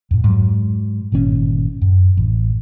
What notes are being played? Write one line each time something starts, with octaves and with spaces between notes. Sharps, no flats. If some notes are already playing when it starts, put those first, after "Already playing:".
F2 A2
G#2 F#3
G1 A#2 D#3 C#4
F#2
A1